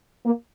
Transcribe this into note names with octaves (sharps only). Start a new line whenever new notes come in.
A#3